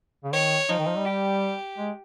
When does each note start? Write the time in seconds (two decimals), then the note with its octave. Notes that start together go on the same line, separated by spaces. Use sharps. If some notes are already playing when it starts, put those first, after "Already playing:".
0.24 C#3
0.33 D#3 C#5
0.69 F3 D#4
0.78 D#3
0.87 F3
0.96 G3
1.06 G4
1.78 G#3